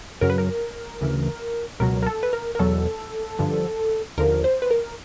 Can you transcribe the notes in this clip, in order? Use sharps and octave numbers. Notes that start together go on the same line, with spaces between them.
F#2 C#3 F#3 A#4
B4
A#4
D2 C#3 E3
C#2 B2 F#3 A#4
A#4
A4
B4
A#4
A#4
E2 B2 F#3 A4
G2 D3 F3
D#2 D3 F3 A#4
C5
B4
A#4